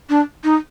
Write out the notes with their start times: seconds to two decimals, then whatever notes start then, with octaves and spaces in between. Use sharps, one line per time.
0.10 D4
0.44 D#4